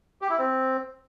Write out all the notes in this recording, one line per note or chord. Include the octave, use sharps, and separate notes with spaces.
G4
E4
C4